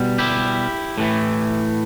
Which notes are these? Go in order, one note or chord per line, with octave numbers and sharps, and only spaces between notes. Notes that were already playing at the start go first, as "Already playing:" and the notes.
Already playing: B2 G3 B3
E4 G4
A2 E3 A3